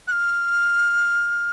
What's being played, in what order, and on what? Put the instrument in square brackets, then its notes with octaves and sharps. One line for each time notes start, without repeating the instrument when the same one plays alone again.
[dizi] F#6
F6